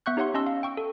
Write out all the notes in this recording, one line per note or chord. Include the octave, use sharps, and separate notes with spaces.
B3 E5 F#5 C#6 F#6 G6
D#4 G4 C#5 E5 F#5 C6
C#4 D#5 A5 C6 E6
F5
G5 C#6 E6
A4